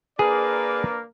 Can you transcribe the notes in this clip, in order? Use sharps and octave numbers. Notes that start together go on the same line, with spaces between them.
A#3 D4 G#4 A#4 B4 D5